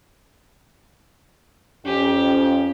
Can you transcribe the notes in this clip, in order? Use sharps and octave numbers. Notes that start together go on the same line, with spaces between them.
F2 C#4 G4